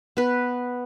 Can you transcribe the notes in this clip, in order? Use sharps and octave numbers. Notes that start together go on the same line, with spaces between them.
B3 B4